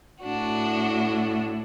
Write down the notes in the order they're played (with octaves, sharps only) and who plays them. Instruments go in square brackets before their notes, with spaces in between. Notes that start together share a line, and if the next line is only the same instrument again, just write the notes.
[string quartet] A2 D4 F#4